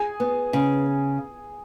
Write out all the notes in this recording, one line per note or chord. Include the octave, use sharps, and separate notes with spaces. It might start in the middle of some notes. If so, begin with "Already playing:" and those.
Already playing: G#4 G#5
B3
C#3